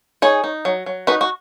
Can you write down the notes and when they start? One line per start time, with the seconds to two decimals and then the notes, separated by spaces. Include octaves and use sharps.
0.22 D#4 G#4 C#5
0.44 D#4
0.65 F#3
0.86 F#3
1.07 D#4 F#4 B4
1.21 F#4